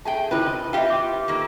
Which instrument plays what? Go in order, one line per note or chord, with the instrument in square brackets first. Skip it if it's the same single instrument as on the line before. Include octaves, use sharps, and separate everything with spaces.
[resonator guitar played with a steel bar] A3 G#4 G5 [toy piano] A5
[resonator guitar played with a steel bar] C3 D#3 B4 [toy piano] C#4 E4 C5
[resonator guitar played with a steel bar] D#5
[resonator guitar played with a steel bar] F4 G4 B4 [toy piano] E5 G5
[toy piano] D6
[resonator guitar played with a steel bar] D#3 A#3 A4